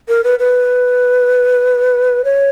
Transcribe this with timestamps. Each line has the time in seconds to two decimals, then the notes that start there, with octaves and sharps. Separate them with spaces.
0.08 A#4
0.24 B4
0.39 B4
2.25 C#5